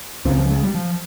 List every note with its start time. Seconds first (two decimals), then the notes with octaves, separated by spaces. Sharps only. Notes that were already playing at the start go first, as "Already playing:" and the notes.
0.25 C#2 C#3 C4
0.38 F3
0.50 G#3
0.63 G3
0.75 F3